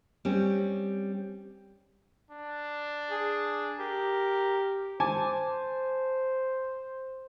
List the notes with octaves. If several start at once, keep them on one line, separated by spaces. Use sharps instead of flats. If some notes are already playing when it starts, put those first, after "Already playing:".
G3 C4 C#4
D4
G#4
G4 A#4
C5 G#5 A5 D6